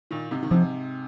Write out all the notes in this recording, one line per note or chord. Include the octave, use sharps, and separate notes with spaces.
A#2 D#3
G#2 C3
D#3
G#2 C3 F3